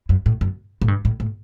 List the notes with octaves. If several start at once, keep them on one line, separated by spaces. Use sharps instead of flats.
F#2
A2
F#2
A2
G2
A2
A2